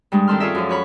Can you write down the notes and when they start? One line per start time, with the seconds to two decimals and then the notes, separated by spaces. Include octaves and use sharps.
0.12 G2 G3 G#3 D4
0.27 D#3 C4 A4 C6 F6
0.40 C#4 F4 G#4 A4 D5 E5
0.55 F#2 F3
0.69 F#4 C#5 B5